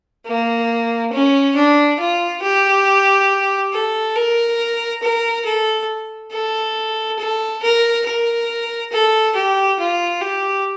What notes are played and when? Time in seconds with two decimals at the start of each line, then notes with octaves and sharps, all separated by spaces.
0.26 A#3
1.12 C#4
1.55 D4
1.99 F4
2.42 G4
3.73 A4
4.15 A#4
5.02 A#4
5.45 A4
6.32 A4
7.19 A4
7.62 A#4
8.06 A#4
8.92 A4
9.35 G4
9.79 F4
10.21 G4